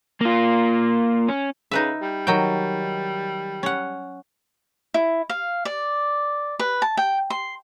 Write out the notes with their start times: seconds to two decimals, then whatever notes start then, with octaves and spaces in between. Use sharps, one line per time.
0.21 A#3 F4
1.29 C#4
1.71 C#3 D#4 B4 E5
2.02 G3
2.27 D#3 F#3 G5
3.63 C#4 F#5
4.94 E4
5.29 F5
5.65 D5
6.59 B4
6.82 A5
6.97 G5
7.30 C6